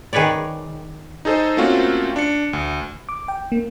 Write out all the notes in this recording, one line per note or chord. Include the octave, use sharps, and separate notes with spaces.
D#3 G#4 B4 C#5 D5
D#4 G#4 A4 C5 D#5
A3 A#3 C4 C#4 F4 F#4
D4 C#7
D2
D6
G5
A#3